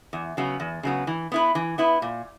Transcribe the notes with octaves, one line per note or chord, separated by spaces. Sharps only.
E2
C#3 F#3 B3
E2
C#3 F#3 B3
E3
B3 E4 B4
E3
B3 E4 B4
A#2